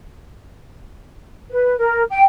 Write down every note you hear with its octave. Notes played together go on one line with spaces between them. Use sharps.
B4
A#4
G5